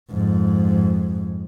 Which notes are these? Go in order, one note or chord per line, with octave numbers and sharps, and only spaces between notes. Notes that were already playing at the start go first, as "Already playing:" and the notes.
F2 G#2